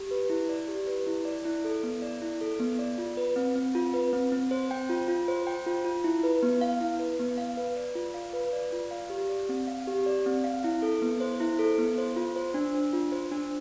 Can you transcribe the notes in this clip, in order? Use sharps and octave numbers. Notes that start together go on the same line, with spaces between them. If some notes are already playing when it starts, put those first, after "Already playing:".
Already playing: G4
B4
E4
D5
G4
B4
E4
D5
E4
A4
B3
D5
E4
A4
B3
D5
F4
B4
C4
C4
F4
B4
C4
C4
C5
G5
F4
F4
C5
G5
F4
F4
E4
B4
B3
F5
E4
B4
B3
F5
B4
D5
F4
F5
B4
D5
F4
F5
G4
D5
C4
F5
G4
D5
C4
F5
E4
A4
B3
C5
E4
A4
B3
C5
F4
C5
D4
D4
F4
C5
D4